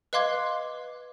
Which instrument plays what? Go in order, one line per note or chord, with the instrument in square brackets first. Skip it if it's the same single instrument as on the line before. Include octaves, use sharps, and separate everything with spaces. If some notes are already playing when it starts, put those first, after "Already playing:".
[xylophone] B4 D#5 F5 C6 D6 G#6